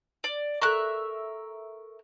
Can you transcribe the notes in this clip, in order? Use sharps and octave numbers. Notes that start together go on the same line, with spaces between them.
D5
A4 A#4 E5 C#6 F#6